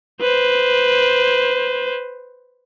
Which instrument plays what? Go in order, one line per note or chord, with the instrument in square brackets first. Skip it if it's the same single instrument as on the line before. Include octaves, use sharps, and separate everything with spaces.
[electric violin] B4 C5